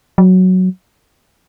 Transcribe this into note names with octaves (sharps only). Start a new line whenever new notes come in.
F#3